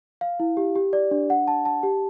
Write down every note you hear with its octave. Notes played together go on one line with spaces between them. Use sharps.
F5
E4
G4
G4
D5
D4
F#5
A5
A5
G4